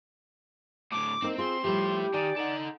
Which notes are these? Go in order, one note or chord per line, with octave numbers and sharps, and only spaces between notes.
A2 D3 D6
A#3 C4 D#4
F4 G#4 C6
F3 G3 A3 E4 G4 C#5
D#3 D5 G#5
D#4 A4 F#5